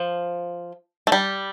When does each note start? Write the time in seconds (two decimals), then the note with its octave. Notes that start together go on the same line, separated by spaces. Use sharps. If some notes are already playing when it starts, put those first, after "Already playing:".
Already playing: F3
1.07 A3
1.12 G3